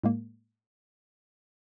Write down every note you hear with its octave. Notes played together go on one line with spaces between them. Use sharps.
A2 G#3 A#3